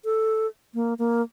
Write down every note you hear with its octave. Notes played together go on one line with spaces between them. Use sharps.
A4
A#3
A#3